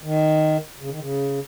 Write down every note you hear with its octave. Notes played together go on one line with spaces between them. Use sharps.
D#3
C#3
D#3
C#3